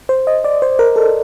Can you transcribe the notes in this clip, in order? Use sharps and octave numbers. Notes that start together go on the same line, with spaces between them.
C5
D#5
D5
C5
A#4
A4